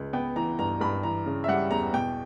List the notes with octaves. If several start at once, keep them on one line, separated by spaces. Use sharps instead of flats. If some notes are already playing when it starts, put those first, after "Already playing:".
Already playing: C#2
B3 G5
E3 A#5
G2 A#5
G2 B5
E3 A#5
C#3
E5
G3 F#5
E2 A#5
B2 G5